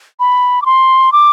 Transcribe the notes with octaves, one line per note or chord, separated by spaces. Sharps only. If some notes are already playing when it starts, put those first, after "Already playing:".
B5
D6
C6
D6